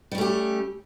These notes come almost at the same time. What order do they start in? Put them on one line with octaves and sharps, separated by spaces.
G3 C#4 A3 G4